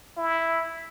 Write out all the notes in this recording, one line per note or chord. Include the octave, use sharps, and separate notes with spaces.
E4